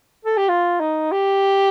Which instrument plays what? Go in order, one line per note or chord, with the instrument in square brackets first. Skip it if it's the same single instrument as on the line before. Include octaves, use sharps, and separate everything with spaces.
[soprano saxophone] A4
G4
F4
D#4
G4